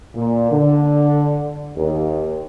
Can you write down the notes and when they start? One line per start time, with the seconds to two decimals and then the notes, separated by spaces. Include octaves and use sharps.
0.15 A#2
0.52 D3
1.76 D#2